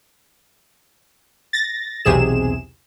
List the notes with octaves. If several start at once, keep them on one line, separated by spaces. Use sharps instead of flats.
A6 A#6
B1 E2 C3 G#4 E7